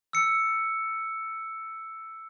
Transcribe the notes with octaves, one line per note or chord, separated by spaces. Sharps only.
E6 C#7